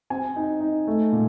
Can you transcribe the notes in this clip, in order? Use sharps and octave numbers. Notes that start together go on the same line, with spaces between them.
C4 G#5
D#4
D#4
A3
A#2